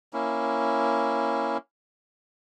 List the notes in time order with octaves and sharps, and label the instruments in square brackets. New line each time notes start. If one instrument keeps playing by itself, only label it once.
[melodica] A#3 C#4 E4